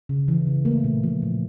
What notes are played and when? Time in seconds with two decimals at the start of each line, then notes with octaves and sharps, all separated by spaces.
0.09 C#3
0.28 E3
0.47 C#3
0.65 A3 A#3
0.84 A#2
1.03 F3
1.22 A#2